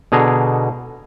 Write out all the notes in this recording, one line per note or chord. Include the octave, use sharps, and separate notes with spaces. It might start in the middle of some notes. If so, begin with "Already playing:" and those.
B2 D3 G#4 A#5